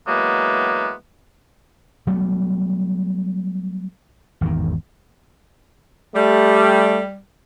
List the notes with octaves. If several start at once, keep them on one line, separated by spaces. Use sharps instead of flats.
E3 F#3 G#3 A#3 B3
F#3 G3 A3 B3
G#1 E2 D3 D#3
G3 A3